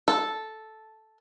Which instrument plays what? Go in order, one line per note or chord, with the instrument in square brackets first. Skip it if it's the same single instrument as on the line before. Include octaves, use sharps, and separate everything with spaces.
[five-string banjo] A4